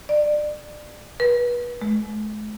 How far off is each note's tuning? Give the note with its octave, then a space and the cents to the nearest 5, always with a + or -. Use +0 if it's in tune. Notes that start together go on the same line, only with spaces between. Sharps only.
D5 +25
B4 -30
G#3 +45